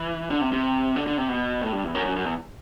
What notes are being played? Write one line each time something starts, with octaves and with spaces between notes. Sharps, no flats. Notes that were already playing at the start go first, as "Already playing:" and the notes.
Already playing: E3
D3
C3
C3
D3
D3
C3
B2
A2
G2
E2
F#2
F#2
F#2
E2